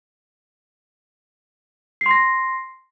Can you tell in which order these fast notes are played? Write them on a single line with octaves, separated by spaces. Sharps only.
C7 C6 A#6